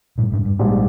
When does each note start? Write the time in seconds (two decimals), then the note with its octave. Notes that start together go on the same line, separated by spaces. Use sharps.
0.18 G2 A#2
0.32 F2 G#2
0.45 G2
0.59 A#1 G#2 G3